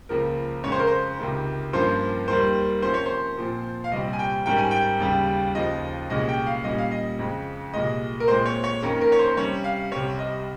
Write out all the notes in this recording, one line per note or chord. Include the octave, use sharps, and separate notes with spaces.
C#2 C#3 F3 A#3 A#4
F2 C#3 G#3 C#4 C#5
C5
A#4
C5
C#2 C3 D#3
G2 F3 A#3 C#4 C5
D#2 D#3 G3 A#3 C5
C3 F3 A#3 C#4 C5
C#5
C5
A#2 F3 C4
F5
C2 A#2 G3 C4 D#5
G#5
G5
G#2 D#3 G3 C#4 G5
G#5
G5
D#2 C#3 G3
D#2 C#3 F3 D#5
C2 A#2 G#3 C#4 D#5
G5
F5
A#2 G3 C#4 D#5
F5
D#5
F2 C#3 G#3
C2 A#2 G#3 D#5
A#4
A#2 G#3 C4 C5
C#5
C#5
F2 D#3 A#3 C#4
A#4
C#5
C5
C3 G3 C#4 C#5
F5
C2 C3 G3 C4 C#5
D#5